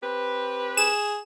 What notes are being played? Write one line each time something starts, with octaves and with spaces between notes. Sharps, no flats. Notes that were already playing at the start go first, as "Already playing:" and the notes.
C4 G4 B4
G#4 E7